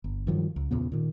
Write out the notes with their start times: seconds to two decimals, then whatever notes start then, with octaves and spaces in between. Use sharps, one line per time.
0.04 G1
0.27 G2 D#3 F3 F#3
0.56 C#2
0.71 E2 A#2 C#3 B3
0.92 A#2 D#3